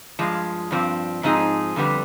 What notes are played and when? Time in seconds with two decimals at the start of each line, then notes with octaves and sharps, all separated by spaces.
0.19 G2 F3 G#3
0.71 G2 F3 C4
1.23 G#2 F3 C4 D#4 G#4
1.76 F2 D3 G3 B3